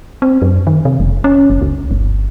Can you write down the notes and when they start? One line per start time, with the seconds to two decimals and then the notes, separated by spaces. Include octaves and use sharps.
0.22 C4
0.42 F#2
0.67 D#3
0.85 C3
1.00 F1
1.24 C#4
1.50 F#1
1.61 C#2
1.91 G1